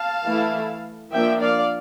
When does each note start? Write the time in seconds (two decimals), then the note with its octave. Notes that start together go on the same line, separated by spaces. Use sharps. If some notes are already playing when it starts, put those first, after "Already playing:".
Already playing: F5 A5
0.26 E3 A3 E4
1.12 F3 A#3 D4 E5 G5
1.41 D5 F5